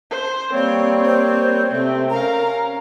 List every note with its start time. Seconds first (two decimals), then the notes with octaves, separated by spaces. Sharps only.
0.10 C5
0.53 G3 A#3 C4 C#5
1.05 C5
1.71 C3 A3 C4
2.10 C#4 A#4 F5 A#5